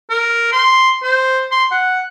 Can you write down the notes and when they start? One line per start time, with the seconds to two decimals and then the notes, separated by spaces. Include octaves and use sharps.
0.10 A#4
0.52 C6
1.03 C5
1.52 C6
1.71 F#5